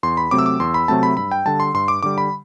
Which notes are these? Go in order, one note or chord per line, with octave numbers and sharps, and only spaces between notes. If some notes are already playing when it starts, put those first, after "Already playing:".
E2 C6
B5
C3 F#3 A3 C4 D6
E6
D6
E2 C6
B5
C3 F#3 A3 C4 A5
B5
G2 B5
G5
D3 G3 A5
C6
G2 C6
D6
D3 G3 D6
B5